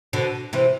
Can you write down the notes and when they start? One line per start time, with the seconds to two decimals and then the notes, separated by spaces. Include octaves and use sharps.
0.13 B2 D3
0.53 C3 E3